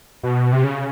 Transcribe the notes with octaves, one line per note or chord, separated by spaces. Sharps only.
B2
C3
C#3